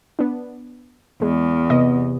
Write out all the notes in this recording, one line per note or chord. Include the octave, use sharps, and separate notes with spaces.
B3 D4
E2 G#3
C3 B3 D#5